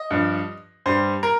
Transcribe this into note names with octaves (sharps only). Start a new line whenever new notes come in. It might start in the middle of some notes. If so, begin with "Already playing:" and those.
Already playing: D#5
G2 F3
G2 G3 C5
A#4